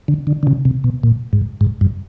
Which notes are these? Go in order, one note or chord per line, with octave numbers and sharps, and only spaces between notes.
D3
D3
D3
C#3
C3
B2
A#2
G#2
G#2
G2